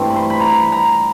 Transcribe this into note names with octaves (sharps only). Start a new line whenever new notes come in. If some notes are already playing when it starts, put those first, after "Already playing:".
Already playing: G2 E3 A3 C4
B5
C6
B5
A#5
B5
A#5